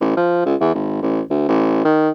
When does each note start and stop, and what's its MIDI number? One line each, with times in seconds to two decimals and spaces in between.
0.01 0.15 33
0.17 0.43 53
0.46 0.55 37
0.61 0.72 40
0.74 0.99 32
1.02 1.21 33
1.30 1.48 38
1.48 1.82 33
1.85 2.10 51